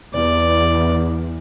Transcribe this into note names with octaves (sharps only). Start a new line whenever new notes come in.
E2 D5